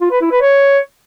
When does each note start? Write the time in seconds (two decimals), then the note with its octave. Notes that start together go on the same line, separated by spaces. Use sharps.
0.01 F4
0.11 B4
0.21 E4
0.31 B4
0.41 C#5